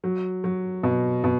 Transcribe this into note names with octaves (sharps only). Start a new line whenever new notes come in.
F#3
F#3
B2
B2